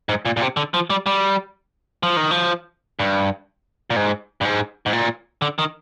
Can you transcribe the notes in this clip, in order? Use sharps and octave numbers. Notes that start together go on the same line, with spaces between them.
G#2
A#2
A#2
C3
D3
F3
G3
G3
F3
D#3
F3
G2
A#2
G#2
G2
G#2
G#2
A#2
D3
D#3